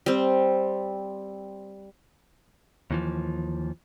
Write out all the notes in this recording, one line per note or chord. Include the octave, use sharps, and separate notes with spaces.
G3 C4
D#2 E3 F3